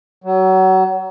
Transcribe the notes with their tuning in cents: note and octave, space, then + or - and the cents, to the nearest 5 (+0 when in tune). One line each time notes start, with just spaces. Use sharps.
F#3 +30